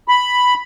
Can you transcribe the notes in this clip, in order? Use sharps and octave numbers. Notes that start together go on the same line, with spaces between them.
B5